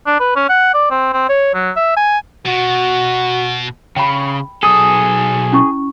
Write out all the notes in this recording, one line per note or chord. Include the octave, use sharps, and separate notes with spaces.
D4
B4
C#4
F#5
D5
C4
C4
C#5
F#3
E5
G#5
B2 F#4
C#3 G5 B5
B1 G#4 A4 D#6
C#4 E4 C#6